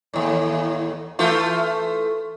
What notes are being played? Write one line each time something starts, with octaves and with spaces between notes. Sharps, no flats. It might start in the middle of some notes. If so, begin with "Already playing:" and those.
D#2 A2
E3 A3 F4